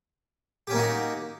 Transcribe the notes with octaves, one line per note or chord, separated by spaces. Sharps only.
A#3 C#4 D#4 F#4 G4